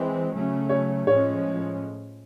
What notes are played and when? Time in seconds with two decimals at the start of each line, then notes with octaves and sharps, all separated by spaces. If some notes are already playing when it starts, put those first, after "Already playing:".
Already playing: E3 G#3 C4
0.32 C#3 F#3 A3 C#4
0.69 C#5
1.07 A2 F3 G#3 C#4 C#5